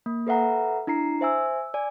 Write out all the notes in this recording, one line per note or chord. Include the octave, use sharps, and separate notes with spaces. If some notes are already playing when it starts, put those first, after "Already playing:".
A#3
A4 B4 E5 F#5 A#5
D4 E4 A#5 C7
C5 E5 G#5 E6
E6
D5 G#5